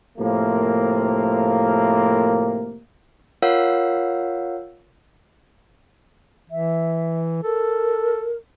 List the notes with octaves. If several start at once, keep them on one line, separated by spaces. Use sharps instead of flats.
A2 C3 F3 A#3
F4 A#4 C#5 F5 F#5 E6
E3 E5
A4 A#4